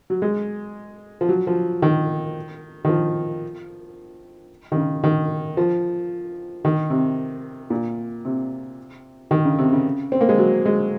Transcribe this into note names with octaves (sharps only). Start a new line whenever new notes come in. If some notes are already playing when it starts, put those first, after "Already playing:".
F#3
G#3
F3
F#3
F3
D#3
D#3
F3
D#3
C#3
D#3
F3
D#3
C3
A#2
C3
D#3
C#3
C3
C#3
C4
A#3
G#3
F#3
G#3